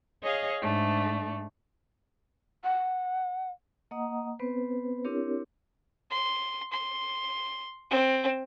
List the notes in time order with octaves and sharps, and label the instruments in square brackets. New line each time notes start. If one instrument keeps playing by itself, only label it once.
[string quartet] G#4 C#5 D#5 F5
G#2 A3 D4
[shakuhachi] F#5
[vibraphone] A#3 D#5 F#5 A#5 D#6
B3 C4 B4 C5
C4 D4 E4 G4 A#4 C#5
[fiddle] C6
C6
C4